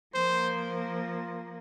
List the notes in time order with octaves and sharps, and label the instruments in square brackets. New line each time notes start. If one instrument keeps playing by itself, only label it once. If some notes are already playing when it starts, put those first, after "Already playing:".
[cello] F3 A#3 [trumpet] C5
[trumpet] F4